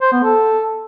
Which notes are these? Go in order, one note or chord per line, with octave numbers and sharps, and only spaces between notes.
C5
B3
A4